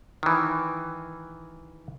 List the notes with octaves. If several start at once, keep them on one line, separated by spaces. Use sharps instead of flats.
D#3 E3